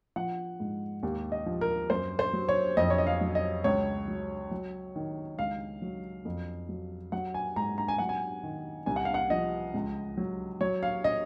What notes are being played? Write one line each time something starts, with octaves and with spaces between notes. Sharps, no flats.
F3 F#5
G#2
D#2
D#5
F3
A#4
F#2 C5
C5
F#3
C#5
F2 D#5
C#5
D#5
F5
F#3
D#5
C#2 C#5
F#3
F#3
D#3
C#2 F5
F#3
F2
F#3
F#3 F#5
G#5
G#2 A#5
A#5
G#5
F#3 F#5
G#5
D#3
C2 G#5
F#5
F5
F#5
F3 D#5
C#2
F#3
F#3 C#5
F5
D#5